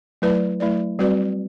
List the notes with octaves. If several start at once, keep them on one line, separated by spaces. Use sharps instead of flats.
F#3 A3 E4 B4 D5
F#3 A3 E4 B4 D5
G3 C4 F#4 B4 D5